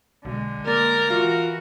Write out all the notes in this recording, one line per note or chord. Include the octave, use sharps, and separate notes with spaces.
B1 D3 G#3
A#3 A#4 D5
E3 F4 F#4 F5